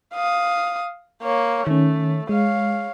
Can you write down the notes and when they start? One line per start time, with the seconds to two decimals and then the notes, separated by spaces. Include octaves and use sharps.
0.14 F5 D#6
1.22 A#3 C#5
1.67 D#3 A3 C#4
2.29 G#3 C#5 F5